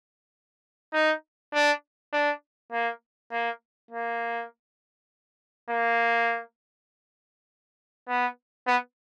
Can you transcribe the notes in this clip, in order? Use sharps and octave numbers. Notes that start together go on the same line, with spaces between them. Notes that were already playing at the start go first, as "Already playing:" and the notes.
D#4
D4
D4
A#3
A#3
A#3
A#3
B3
B3